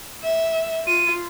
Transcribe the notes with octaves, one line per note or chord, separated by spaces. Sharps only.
E5
F4 D#7